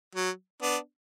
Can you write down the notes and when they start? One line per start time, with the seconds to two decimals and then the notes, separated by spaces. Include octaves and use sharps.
0.16 F#3
0.62 B3 D4